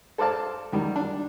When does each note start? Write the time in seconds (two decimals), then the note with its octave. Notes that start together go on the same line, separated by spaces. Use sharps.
0.18 A4 C5 D5 F5 A5
0.73 E2 D#3 G3
0.96 D4